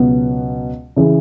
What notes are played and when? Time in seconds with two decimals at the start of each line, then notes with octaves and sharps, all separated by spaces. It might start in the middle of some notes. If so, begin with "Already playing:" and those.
Already playing: C#2 B2 F#3 B3
0.96 C#3 E3